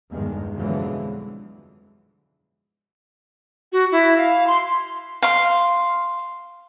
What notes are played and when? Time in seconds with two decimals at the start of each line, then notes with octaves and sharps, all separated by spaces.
0.11 B1 E2 G2 D#3 G#3
0.55 F2 B2 D3 E3 F#3 G#3
3.72 F#4
3.91 E4
4.17 F5
4.47 C6
5.22 F5 C6